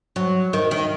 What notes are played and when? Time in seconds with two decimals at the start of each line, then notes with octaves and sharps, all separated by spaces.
0.16 F#3
0.53 D#3
0.71 D#3